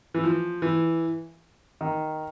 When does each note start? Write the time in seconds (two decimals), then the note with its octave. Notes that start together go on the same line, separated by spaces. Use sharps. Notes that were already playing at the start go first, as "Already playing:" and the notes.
0.14 E3
0.24 F3
0.62 E3
1.81 D#3